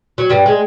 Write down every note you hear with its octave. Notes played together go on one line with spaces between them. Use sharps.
F#3
G2 G3
G#3